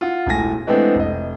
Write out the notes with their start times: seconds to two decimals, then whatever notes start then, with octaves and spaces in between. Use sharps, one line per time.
0.01 F4 F#5
0.27 E1 A2 G#5 A#6
0.67 E3 G#3 A3 B3 C4 D4
0.96 F1 D#5